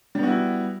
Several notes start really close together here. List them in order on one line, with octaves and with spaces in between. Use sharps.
G3 B3 F#4 E4